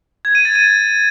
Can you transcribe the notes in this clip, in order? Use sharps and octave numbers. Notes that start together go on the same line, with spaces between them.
G#6
D#7
A6
D#7